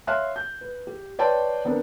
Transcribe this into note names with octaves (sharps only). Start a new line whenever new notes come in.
C#5 E5 F5 C6 F6 F#6
G6
B4
G4
B4 C#5 D5 G5 A5 C6
B3 C4 D4 A#4